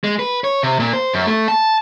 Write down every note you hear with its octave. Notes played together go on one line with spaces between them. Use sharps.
G#3
B4
C#5
C3
A#2
C5
F#2
A3
A5